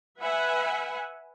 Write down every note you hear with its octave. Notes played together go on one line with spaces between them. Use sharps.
B4 E5 F#5 G#5